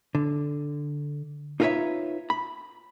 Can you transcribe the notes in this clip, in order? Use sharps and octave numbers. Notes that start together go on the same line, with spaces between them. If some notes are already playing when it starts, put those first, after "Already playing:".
D3
D#4 F4 A#4 B4 C#5 E5
B5